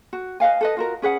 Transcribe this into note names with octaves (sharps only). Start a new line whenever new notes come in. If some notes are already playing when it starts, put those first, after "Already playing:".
F#4
B4 D#5 F5 G#5
A4 B4 D#5
F4 F#4 A#4
C#4 G#4 B4 F#5